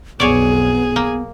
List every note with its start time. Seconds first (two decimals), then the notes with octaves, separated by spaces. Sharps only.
0.20 B1 F2 B3 G#4 C#5 D5
0.96 A#3